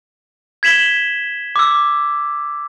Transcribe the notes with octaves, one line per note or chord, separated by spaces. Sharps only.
G#6 B6 E7 F#7 G7
D6 E6